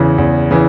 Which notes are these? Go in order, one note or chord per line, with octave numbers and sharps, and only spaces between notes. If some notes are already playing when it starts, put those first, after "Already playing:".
Already playing: E2 C#3 E3
E2
C#3 E3